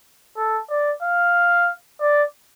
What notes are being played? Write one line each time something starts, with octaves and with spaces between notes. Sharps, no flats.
A4
D5
F5
D5